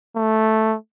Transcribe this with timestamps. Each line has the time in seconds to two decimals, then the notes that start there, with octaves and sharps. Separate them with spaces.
0.16 A3